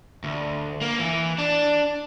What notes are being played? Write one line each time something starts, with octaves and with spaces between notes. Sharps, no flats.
D2
A#3
E3
D4